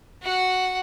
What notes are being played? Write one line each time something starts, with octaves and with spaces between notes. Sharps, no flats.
F#4 F#5